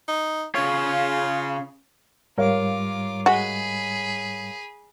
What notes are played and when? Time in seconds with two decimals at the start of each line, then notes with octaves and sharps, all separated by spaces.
0.08 D#4
0.55 C#3 F4 C#5
2.38 G#2 G3 F4 A#4 C#5 F5 D6
3.26 G#3 F#4 G#4 B5